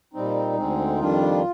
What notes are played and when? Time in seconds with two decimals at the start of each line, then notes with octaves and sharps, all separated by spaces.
0.13 A#2 G3 C4 D#4
0.57 D2 D3 G#3 C4
0.99 F2 D#3 G3 D4 F4